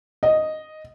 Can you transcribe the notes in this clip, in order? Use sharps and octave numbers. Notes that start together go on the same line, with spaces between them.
D#5